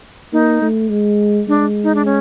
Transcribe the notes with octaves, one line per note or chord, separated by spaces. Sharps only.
A#3 D#4
A3
G#3
G#3 D4
D#4
D4
C#4